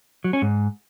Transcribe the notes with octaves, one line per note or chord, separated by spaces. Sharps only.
F#3
C#4
G#2